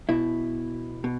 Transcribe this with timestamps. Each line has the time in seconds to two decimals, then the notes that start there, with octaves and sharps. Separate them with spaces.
0.09 B2 E4
1.04 B2